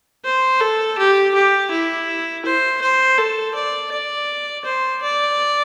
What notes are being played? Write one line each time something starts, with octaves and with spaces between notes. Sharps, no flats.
C5
A4
G4
G4
E4
C5
C5
A4
D5
D5
C5
D5